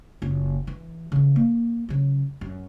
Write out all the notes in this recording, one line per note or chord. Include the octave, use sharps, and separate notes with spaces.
F#1 F4
E3
C#3 E3
A#3
C#3 F#3
F#2